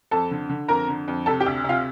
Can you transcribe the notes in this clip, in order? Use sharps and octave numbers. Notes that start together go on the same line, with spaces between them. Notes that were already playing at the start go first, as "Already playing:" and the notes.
F2 A4 A5
D3
D3
F2 A#4 A#5
D3
F2
C3 A4 A5
G4 G5
D2
C3 F4 F5